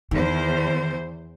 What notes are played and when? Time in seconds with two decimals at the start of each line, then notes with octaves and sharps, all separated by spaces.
0.11 E2 D#3 C5